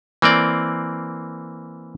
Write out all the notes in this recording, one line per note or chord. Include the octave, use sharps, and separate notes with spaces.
E3 A#3 C4 D5